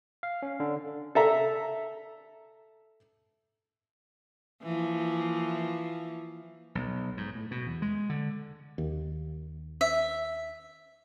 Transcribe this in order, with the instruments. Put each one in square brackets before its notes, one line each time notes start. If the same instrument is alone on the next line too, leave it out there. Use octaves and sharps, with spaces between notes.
[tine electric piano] F5
C#4
D3
[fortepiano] A4 E5 A#5
[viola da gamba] E3 F3 A#3
[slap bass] B1
G#2
A2
B2
E2
G#3
D3
[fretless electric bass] D#2
[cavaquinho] E5